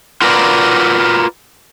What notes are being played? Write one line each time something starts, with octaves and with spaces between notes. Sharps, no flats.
F4 F#4 A#4 B4 D5